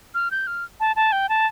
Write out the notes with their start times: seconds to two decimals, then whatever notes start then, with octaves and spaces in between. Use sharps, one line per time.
0.15 F6
0.31 G6
0.47 F6
0.80 A5
0.96 A5
1.12 G5
1.29 A5